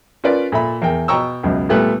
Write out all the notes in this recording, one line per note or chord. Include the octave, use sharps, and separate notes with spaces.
C#4 F4 A#4 B4 D5
A#2 A4 E5 B5
E2 A#4 G5
B2 G5 A#5 C#6 E6
C#2 F#2 B2
A#2 G3 A3 B3 F#6